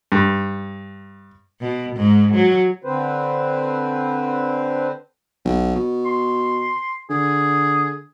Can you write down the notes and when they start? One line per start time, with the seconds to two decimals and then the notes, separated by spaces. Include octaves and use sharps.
0.12 G2
1.61 B2
1.96 G#2
2.34 F#3
2.84 D3 C4 B4 C5
5.45 B1
5.76 B2
6.06 C6
7.10 D3 G#4